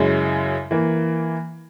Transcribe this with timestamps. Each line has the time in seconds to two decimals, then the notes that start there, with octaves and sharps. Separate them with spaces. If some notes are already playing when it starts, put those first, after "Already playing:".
Already playing: F#2 C#3 G#3 C#4 E4
0.71 E3 A#3